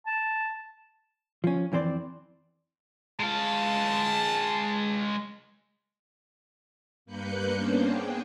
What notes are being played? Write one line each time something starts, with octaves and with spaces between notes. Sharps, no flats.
A5
F3 C#4
F2 E3 C4 C5 D5
G#3 F5 A5
G2 A#3 B4 F#6 G6 C#7
A#3 B3 C#4 D4 C5
G#4 G5